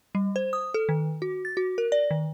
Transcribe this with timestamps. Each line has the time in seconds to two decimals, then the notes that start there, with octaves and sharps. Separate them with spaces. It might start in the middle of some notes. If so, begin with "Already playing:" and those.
0.15 G3
0.36 C5
0.53 D#6
0.74 A4
0.89 D#3
1.22 F#4
1.45 A6
1.57 F#4
1.78 A#4
1.92 D5
2.11 D#3